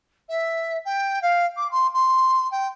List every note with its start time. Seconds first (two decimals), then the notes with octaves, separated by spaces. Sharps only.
0.29 E5
0.85 G5
1.22 F5
1.57 D6
1.71 C6
1.94 C6
2.51 G5